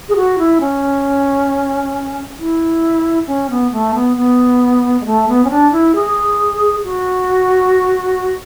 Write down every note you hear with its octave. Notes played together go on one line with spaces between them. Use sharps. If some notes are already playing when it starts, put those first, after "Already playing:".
G#4
F#4
E4
C#4
E4
C#4
B3
A3
B3
B3
G#3
A3
B3
C#4
D4
E4
G#4
F#4